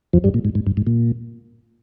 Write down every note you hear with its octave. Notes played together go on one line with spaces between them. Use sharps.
F2 F3
G2 G3
A#2
G#2
G#2
G2
G#2
A#2